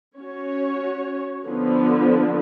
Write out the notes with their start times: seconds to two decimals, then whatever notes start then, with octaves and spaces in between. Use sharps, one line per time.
0.18 C#4 F#4 C#5
1.46 D3 F3 B3